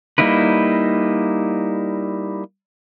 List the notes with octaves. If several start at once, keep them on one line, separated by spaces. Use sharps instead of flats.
G3 A#3 D#4 E4 B4